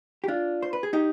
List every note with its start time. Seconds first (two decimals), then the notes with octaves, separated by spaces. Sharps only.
0.24 G4
0.28 D4 F4
0.62 C5
0.73 B4
0.83 G#4
0.93 D#4 G4